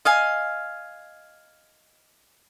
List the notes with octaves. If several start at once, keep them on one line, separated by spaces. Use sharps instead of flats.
D#5 F5 G#5